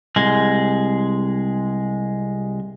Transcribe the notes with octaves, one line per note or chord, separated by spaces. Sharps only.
C2 G#3